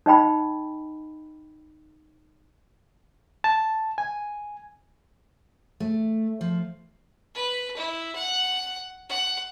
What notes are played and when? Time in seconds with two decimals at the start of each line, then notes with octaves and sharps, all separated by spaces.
0.06 D#4 D#5 G5 B5
3.44 A5
3.98 G#5
5.80 A3
6.41 F3
7.35 B4
7.76 E4
8.15 F#5
9.09 F#5